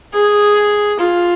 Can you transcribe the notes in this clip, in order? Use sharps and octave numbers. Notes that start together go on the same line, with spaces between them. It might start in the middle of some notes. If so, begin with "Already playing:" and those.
G#4
F4